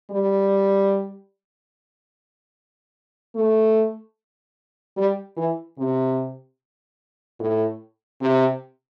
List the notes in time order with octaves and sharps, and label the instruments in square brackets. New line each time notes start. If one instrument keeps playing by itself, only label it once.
[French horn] G3
A3
G3
E3
C3
A2
C3